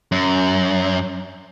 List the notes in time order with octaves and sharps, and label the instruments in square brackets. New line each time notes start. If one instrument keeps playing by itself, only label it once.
[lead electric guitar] F#2